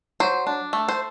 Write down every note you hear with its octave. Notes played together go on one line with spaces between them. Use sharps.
F#3 C5
D4
A3
C5